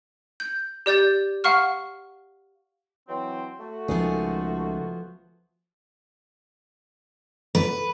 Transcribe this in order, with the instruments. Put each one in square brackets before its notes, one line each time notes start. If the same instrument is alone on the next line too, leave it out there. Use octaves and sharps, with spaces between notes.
[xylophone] G6
G4 D5 G6 A6
F5 F#5 C#6 F6
[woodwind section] E3 F#3 C4
A3 F#4
[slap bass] C#2 D#3 [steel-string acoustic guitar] F3 B3 G#4
[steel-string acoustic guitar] B4